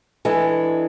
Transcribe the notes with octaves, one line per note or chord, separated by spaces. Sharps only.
E3 G#3 D4 A4